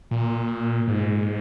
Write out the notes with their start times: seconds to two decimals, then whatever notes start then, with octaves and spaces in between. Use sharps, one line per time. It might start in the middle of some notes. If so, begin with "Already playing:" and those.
0.11 A#2
0.88 G#2